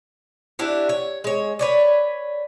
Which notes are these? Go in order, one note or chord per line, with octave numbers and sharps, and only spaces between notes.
D4 E4 F#4 G4
C#5
G#3 C#5
B4 C#5 D5